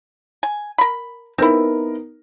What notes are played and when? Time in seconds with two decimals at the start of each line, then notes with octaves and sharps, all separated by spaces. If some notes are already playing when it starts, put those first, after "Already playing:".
0.43 G#5
0.78 A#4 B5
1.38 B3 C4 D#4 E4 A#4